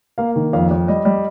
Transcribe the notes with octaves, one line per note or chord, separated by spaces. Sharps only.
A#3 F5
D#3
F2 F5
F2
G3 D#5
G3